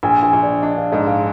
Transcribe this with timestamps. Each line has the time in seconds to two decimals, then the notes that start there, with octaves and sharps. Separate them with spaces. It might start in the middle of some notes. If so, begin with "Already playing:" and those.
0.03 A#1 G#5
0.23 G#5
0.33 A#1
0.43 D5
0.62 D4 D#5
0.77 F5
0.92 G#2 D#5
1.07 F5